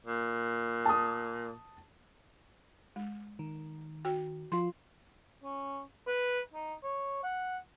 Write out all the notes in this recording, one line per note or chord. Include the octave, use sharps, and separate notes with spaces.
A#2
A5 D#6
G#3
D#3
F#4 G5
F3 F4 C6
C#4
B4
D#4
C#5
F#5